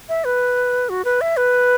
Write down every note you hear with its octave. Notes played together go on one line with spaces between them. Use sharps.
E5
B4
F#4
B4
E5
B4